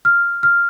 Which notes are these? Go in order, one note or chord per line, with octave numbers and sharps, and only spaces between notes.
F6
F6